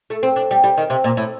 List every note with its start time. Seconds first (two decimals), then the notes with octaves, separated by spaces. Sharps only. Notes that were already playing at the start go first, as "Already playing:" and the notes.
0.10 A3
0.23 C4
0.36 D4
0.51 G3
0.64 G3
0.77 D#3
0.90 C3
1.04 A#2
1.17 A2